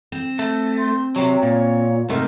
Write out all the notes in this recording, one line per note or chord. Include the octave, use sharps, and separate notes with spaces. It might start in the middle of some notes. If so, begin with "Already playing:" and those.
C4
A3
C6
C3 F#3 C#5
A#2
G#2 C3 A3 A#4